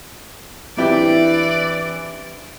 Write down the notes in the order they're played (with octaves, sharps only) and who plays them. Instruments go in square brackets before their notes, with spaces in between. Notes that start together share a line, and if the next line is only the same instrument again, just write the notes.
[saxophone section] E3 [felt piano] C4 [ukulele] D4 E4 G4 [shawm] D5